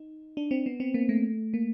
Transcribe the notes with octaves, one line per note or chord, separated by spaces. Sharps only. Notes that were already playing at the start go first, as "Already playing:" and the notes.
Already playing: D#4
D4
C4
B3
C4
A#3
A3
A#3